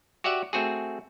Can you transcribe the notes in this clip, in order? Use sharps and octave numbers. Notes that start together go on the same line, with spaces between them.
F#4 G4 D5 E5 F#5
A3 C4 F#4 G#4